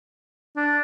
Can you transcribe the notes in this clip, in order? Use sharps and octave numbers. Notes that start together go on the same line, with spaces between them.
D4